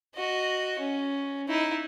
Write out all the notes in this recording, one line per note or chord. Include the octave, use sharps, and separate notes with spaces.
F#4 D#5
C#4
D#4 E4